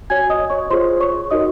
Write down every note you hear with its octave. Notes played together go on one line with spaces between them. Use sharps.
F#4 C#5 G#5 G#6
D#5 D#6
C#5 C#6
F4 G#4 C5 C#5 C6
C#5 C#6
D#4 F#4 A#4 C#5 D#5 D#6